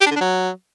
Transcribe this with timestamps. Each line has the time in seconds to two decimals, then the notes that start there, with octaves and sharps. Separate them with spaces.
0.01 G4
0.06 D4
0.11 D3
0.16 D4
0.21 F#3